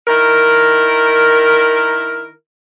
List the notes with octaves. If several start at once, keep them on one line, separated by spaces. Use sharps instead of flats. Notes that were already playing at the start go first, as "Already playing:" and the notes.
D#3 E4 A#4